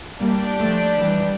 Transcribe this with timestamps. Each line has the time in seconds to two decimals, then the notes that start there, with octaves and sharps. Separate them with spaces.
0.20 G3 A#3 D4 G4 D5
0.59 F3 A3
0.99 E3 G3